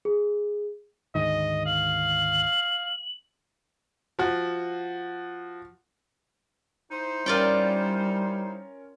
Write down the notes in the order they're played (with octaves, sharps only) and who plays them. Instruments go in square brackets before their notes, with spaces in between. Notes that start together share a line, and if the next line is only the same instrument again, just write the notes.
[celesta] G#4
[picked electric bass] D2 G#2 D#3 [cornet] D#5
[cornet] F5 [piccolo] F#7
[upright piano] F3 F#4
[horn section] D#4 E4 C5
[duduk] G3 [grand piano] C#4 A#4 [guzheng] F4 D5 G5